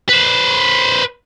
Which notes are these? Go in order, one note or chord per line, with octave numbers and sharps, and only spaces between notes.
B4 C5